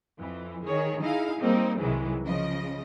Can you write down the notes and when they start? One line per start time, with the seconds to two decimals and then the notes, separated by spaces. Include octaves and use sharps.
0.19 F2 E3
0.66 D#3 G#4 C#5
1.01 D#4 E4 G#4 F5
1.40 G3 A#3 C4 D#4
1.78 C2 D#3 E3 F#3 G#3
2.24 C#3 F3 D#5